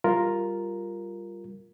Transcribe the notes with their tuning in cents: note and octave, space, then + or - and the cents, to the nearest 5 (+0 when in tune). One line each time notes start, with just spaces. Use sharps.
G3 +0 F4 +0 A#4 +0